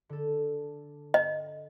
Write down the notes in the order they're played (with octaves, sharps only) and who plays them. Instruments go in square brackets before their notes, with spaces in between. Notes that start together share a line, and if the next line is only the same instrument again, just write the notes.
[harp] D3 A4
[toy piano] D#5